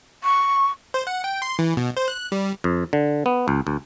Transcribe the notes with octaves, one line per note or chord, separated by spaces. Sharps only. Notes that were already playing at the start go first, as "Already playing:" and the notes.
C#6
C5
F#5
G5
C6
E3
B2
C5
F#6
G3
F2
D3
B3
C#2
D2